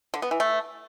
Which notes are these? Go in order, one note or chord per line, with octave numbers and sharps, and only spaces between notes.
D3
B3
E3
A3